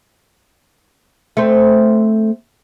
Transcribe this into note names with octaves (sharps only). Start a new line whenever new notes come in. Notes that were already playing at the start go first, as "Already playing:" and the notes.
A3 C4